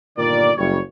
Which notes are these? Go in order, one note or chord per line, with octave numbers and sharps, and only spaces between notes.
G1 A#2 D#3 A#4 D5
F#1 G3 C#5